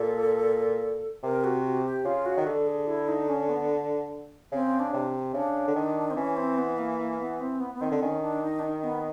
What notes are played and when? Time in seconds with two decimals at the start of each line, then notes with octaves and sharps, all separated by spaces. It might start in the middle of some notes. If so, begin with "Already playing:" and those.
Already playing: A#2 A4
1.24 C3 A#4
1.44 F#4
1.64 F#4
1.84 G4
2.05 C#3 F4
2.25 F#4
2.37 D#3
2.46 D3 A4
2.67 G#4
2.87 E4
3.08 D#4
3.28 C#4
3.49 B3
4.52 C#3 C4
4.79 D4
4.94 C3
5.34 C#3 D4
5.68 D3
5.76 D#3
6.10 C4
6.16 E3 C#4
6.37 C4
6.58 B3
6.78 A#3
6.99 A#3
7.19 B3
7.40 C4
7.60 B3
7.74 B3
7.81 D#3 C4
7.91 D3
8.02 D#3 C#4
8.22 D4
8.42 D#4
8.59 D4
8.63 D#4
8.84 B3